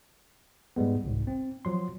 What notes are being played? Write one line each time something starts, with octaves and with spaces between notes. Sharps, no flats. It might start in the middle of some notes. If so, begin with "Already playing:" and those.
G#2 G3 G#3 B3
G1 C2 G#2
C4
F3 F#3 C6